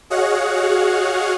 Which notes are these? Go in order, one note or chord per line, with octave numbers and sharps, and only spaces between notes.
F#4 G#4 C#5 D#5 F5 F#5